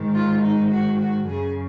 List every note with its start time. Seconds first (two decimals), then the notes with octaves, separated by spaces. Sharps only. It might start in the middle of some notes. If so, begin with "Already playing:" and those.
Already playing: G#2 D#3
0.14 F4
0.42 D#4
0.71 F#4
0.99 F#4
1.27 F#2 C#3 G#4